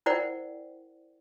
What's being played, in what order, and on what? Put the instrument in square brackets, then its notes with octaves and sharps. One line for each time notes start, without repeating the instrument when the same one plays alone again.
[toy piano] E4 A#4 C5 D5 F#5 G5